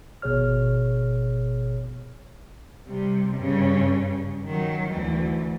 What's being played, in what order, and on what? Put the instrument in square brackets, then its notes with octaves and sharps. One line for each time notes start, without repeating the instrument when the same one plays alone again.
[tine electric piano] G#1 B2 G#4 C#5 F6
[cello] C3 G3
G2 C#3
D#3 F#3
D2 E3